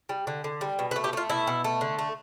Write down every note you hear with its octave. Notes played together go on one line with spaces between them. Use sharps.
G3
D3
D3
G3
B2
B4
A3
G4
A3 F4
B2 E4
B2
A3
D3
A3